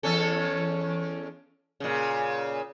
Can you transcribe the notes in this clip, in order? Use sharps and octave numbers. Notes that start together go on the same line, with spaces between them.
E2 C#4 A4
A#2 C#3